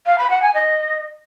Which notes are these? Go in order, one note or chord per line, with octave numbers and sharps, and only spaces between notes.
F5
B5
F#5
G#5
D#5